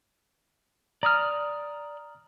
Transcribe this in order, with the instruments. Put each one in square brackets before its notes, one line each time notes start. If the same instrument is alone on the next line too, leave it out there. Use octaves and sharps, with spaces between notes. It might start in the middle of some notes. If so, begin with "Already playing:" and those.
[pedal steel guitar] D5 F6 [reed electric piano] A#5 D#6